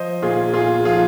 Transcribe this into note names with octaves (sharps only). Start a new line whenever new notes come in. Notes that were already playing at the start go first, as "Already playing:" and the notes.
Already playing: F3 C5 D#5
A#2 F4 G#4
A#2 F4 G#4
F3 F4 G#4